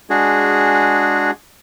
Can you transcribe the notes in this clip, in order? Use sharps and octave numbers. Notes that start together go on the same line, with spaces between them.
G#3 D4 F#4 G#4